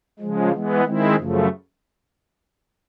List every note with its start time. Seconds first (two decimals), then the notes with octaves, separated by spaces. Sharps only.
0.20 C#3 F3 G#3
0.52 E3 G#3 B3
0.84 D#3 G#3 C4 E4
1.16 F#2 C#3 F3 A3